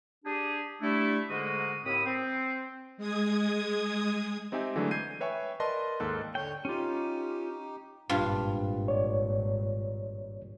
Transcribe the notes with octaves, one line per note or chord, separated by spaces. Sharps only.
D4 G4 G#4
G3 A3 D4 E4
G#2 D3 G#3 A#3 F#4 D#6
D#2 A2 C4 B5 D#6
C4
G#3 D#6 G#6
C4 D#4 G4 E5 G#5
D3 E3 F#3 G#3 A3 D4
G6 G#6 C7 D#7
B4 C#5 E5 G5 G#5 C#6
A#4 B4 D5 D#5 A5 C6
D#2 G#2 A4 F#6
D3 C#5 G5
C#4 D#4 F4 G4
G#1 G2 A#2 F4
C#5 D5